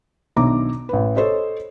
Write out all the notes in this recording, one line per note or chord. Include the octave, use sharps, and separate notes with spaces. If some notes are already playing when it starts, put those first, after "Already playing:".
B1 D#3 D4 E5 A#5 D6
A1 B4
A4 C5 C#5 D#5